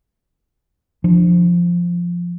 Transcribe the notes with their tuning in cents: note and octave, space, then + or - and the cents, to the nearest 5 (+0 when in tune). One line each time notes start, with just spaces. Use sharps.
F3 +0 D4 +25